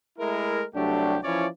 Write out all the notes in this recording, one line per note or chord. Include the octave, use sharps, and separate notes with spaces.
G#3 A3 E4 A#4
C2 F#3 A3 D4 G4
E3 F3 C#4 E4 C#5 D5